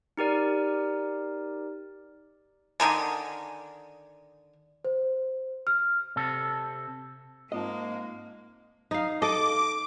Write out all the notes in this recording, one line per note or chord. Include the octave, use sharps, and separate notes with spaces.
D#4 G4 A#4 D5
D3 D#3 A#4 G#5
C5
F6
C3 A4
G#2 G#3 A#3 C4 F4 D#5 A5
D#4 F5
A4 D#5 D6